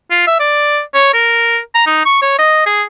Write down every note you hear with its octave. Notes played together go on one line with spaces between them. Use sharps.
F4
E5
D5
C#5
A#4
A#5
D#4
C#6
C#5
D#5
G#4